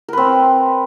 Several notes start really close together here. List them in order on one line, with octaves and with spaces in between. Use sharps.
A#4 B4 C4